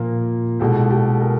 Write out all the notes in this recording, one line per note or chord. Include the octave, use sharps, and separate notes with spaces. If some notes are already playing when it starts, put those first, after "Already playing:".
Already playing: A#2 F3 A#3
C2 B2 G#3 G4 A4
G4 A4
G#4 A#4